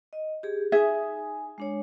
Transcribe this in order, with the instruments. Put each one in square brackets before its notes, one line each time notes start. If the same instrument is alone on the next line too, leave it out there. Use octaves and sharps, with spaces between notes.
[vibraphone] D#5
G4 G#4
[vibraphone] D#4 G#5 [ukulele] G#4 E5
[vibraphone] G#3 D4 C#5